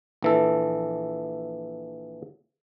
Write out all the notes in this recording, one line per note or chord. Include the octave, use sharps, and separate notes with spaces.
A#1 E3 A4